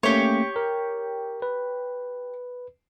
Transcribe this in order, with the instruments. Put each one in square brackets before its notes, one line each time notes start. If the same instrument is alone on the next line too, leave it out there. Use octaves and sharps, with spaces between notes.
[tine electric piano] A3 A#3 C#4 [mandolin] G4 C#5
[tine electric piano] A#4
B4